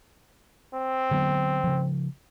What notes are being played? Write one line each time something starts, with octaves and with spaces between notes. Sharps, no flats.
C4
D3 F#3 B3
C#3 F3